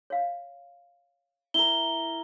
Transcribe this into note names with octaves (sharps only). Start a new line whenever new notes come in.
C#5 F5
E4 A#4 G7